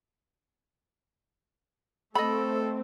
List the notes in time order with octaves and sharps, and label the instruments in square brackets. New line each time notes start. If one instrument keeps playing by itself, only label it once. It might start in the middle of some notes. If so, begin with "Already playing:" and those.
[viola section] A3 C4 [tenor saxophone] A4 [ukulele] D#5 B5